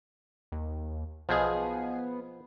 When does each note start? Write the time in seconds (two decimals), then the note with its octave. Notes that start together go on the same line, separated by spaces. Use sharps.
0.52 D#2
1.29 B1 B2 F3 B3 G#4